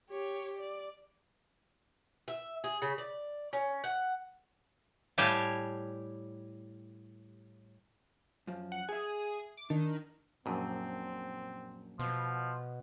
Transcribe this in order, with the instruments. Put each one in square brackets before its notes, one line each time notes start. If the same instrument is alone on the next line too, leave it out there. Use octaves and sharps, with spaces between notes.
[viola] G4 C#5
D5
[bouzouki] E5
G#4
C#3
D5
C#4
F#5
[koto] A2 G3 G4 F5 G#5 A5
[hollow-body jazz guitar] F#2 F3
[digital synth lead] F#5
[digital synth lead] G#4 [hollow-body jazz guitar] E5 G#5
[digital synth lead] D6
[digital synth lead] D#3 [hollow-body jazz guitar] D4
[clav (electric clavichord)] A#1 F#2 [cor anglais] C4
[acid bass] B2 [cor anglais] F3